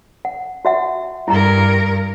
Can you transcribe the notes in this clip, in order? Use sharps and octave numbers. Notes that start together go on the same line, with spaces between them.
F#5
F#4 E5 F#5
G2 E4 A#4 A#5